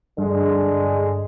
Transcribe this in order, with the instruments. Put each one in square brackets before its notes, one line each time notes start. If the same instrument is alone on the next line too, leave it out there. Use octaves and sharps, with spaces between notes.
[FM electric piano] G2 [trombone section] D3 G#3